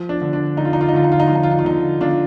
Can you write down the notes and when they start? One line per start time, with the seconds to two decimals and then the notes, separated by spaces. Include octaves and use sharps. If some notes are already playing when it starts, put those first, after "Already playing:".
Already playing: F3
0.09 D4
0.21 D3
0.33 D4
0.57 D3 D#4
0.65 F4
0.73 D#4
0.81 F4
0.89 D#4
0.93 D3 F4
1.04 D#4
1.12 F4
1.20 D#4
1.28 F3 F4
1.35 D#4
1.43 F4
1.51 D#4
1.59 F4
1.65 D3 D#4
2.01 D3 D4 F4